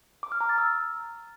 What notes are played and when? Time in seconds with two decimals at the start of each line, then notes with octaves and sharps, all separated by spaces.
0.23 D6
0.32 F6
0.41 A#5
0.49 A6
0.58 E6